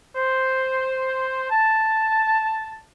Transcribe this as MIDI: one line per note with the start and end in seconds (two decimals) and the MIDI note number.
0.16 1.45 72
1.51 2.84 81